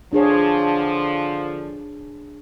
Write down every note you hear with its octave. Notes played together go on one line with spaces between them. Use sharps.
D3 F3 D4 G#4 C#5